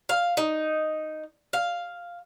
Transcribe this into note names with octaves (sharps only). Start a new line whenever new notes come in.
F5
D#4
F5